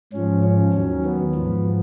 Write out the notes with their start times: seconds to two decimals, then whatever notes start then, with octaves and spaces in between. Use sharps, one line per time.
0.13 G#2 F3 C#4
0.44 C#4
0.73 D#2 D#3 F#3 C#4
1.04 B3
1.35 G#2 F3